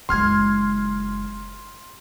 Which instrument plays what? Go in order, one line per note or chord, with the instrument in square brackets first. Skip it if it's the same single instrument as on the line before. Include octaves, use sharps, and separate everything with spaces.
[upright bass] F#1 G#3 [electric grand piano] C6 F6 G#6